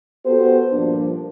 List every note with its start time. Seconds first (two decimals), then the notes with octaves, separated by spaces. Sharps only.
0.25 B3 F#4 G4 A4 C5
0.72 G2 A#2 F3 A#3 D4